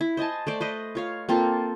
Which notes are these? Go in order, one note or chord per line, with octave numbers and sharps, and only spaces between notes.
E4
C5 D#5 G#5 A5
A3 C5 D5
B4 C5 D#5
F4 C#5 F5
A#3 C4 F4 A4